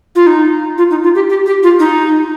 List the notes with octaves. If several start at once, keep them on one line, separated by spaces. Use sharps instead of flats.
F4
D#4
F4
D#4
F4
G4
G4
G4
F4
D#4